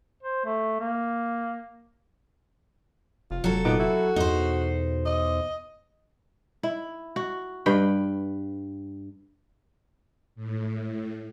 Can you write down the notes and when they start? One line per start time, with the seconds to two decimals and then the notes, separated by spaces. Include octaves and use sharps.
0.23 C5
0.45 A3
0.80 A#3
3.31 F1 F4
3.44 F1 F#3 A4
3.65 A#2 B3 D#4 D6
3.80 E4 F#4
4.16 E2 B2 D#4 C5
5.06 D#5
6.63 E4
7.16 F#4
7.66 G2 B4 G5
10.35 A2